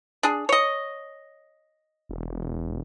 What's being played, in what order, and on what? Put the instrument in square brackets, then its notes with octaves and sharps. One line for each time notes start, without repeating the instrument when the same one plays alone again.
[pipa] D4 G#4
C#5 D#5
[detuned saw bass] E1